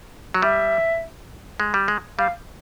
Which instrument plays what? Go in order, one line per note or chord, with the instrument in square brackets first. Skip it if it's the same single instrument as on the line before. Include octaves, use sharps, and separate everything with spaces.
[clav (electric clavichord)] F#3
[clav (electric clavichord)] G3 [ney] E5
[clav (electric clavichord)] G#3
G3
G#3
[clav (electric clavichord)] G3 [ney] F5